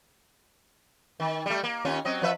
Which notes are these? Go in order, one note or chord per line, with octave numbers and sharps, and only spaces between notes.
D#3
G3 A3
A#3
D#2 C#4 F4
F#3 C4 D#5
F3 B4 E5